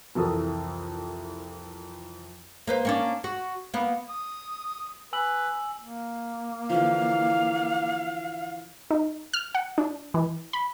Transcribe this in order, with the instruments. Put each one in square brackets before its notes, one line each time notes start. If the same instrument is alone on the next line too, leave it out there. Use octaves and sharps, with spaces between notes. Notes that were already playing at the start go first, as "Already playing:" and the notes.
[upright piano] C2 F2 E3 A4 A#4 D#6
[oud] A#3 B4 C5
A#3 C#4 D4
F#4
A#3 B3
[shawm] D#6
[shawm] B4 [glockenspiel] G#5 E6 F#7
[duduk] A#3
[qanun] D3 E3 F3 [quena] F5
[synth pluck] D#4
F6
F#5
D4
E3
B5